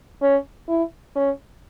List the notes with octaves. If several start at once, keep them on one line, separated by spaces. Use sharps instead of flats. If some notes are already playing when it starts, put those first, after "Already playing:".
C#4
E4
C#4